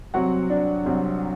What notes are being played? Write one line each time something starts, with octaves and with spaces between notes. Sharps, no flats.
C2 C3 F#3 C4 F#4 F#5
D4 D5
C2 C3 F#3 C4